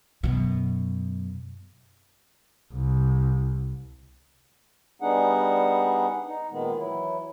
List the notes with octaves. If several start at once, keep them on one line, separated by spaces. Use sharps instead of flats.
F#2 B2
C2
G3 B3 D4 D#4 G#4 F#5
D#4
A#2 D#3 G#3 B3
E3 F#3 E4